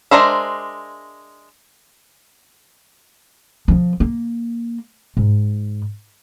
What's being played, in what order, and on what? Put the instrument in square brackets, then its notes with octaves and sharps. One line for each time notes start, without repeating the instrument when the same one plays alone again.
[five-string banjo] G#3 D4 A#4 C5 E5
[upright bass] F3 C4
A#3
G#2